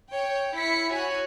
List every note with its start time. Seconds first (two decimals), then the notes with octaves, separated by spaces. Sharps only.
0.11 C#5 G5
0.56 E4 B6 C#7
0.92 F#4 C#5 G#5